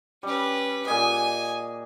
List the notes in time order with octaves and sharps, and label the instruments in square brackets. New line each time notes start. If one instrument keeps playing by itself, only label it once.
[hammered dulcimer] G3 [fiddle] C#4 B4
[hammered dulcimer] A#2 G#4 D#5 [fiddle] G#5